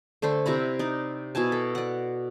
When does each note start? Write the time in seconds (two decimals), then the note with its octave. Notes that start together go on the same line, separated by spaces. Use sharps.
0.22 D3 A3 A4 C5
0.46 C3 E4 A#5 B5
0.79 D#4 D5
1.35 B2 E4 G#5 A5
1.52 A4
1.75 D5 F#5